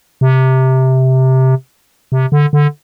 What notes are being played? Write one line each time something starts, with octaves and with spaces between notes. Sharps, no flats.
C3
C3
D3
D3